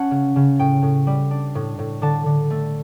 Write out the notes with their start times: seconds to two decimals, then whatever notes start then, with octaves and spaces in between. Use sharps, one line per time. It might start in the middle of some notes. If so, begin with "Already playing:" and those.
Already playing: C#4 F#5 A5
0.11 C#3
0.36 C#3
0.59 A2 G5
0.82 A2
1.07 G3
1.31 D4
1.55 A2
1.79 A2
2.02 D3 A5
2.26 D3
2.50 A3